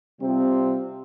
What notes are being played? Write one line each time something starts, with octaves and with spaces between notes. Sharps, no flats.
C3 G3 C4 F4